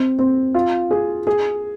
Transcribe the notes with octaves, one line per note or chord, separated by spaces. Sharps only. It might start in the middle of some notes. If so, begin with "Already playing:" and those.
Already playing: C4
C4
F4
G#4
G#4